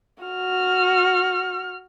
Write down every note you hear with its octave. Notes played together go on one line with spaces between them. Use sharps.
F#4 F6